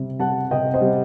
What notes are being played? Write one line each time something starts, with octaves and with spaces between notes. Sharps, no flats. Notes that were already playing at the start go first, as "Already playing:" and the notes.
Already playing: C3 G3
G3 F#5 A5
C3 D#5 G5
C5 D#5
G3